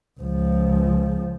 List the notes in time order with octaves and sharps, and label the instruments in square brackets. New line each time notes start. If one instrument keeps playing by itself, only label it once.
[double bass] C#2 F3